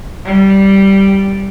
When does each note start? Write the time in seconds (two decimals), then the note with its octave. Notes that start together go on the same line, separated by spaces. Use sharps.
0.24 G3